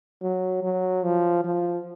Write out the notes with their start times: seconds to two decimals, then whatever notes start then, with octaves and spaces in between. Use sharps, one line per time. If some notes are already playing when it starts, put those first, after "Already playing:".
0.22 F#3
0.63 F#3
1.03 F3
1.44 F3